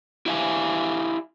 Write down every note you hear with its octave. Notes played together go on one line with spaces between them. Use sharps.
E4 G4 E5 F5 G#5